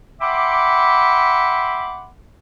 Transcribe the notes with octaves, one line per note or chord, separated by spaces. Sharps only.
E5 F#5 G5 B5 C6 D6